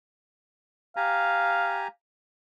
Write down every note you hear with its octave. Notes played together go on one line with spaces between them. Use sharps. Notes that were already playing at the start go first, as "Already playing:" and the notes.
G4 F5 G#5 A#5